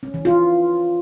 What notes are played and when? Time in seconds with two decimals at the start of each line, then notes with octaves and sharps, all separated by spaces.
0.03 C#4
0.14 E3
0.25 F4